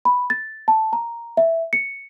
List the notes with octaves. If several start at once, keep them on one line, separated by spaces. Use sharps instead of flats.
B5
A6
A5
A#5
E5
C#7